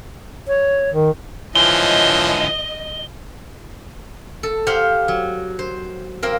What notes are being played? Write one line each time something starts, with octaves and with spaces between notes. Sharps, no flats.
C#5
D#3
G#2 D3 E3 F3 C#5 D#5 G7
A4
G4 C5 F5 F#5
F#3
C5
A#3 C4 A#4